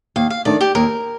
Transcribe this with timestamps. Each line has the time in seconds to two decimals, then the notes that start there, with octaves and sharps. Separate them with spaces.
0.16 D#2 F5
0.30 F5
0.45 D#3 A3 D4 D5
0.61 G4
0.75 D#2 A#4